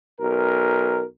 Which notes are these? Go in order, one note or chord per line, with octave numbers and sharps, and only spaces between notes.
B1 A#4